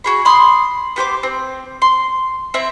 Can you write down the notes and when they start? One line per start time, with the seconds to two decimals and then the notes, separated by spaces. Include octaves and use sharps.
0.04 F#4 G#4 B5
0.25 B5 C6 D#6
0.96 B3 G4 C5 D6
1.23 C4
1.82 C6
2.54 C4 E4 E5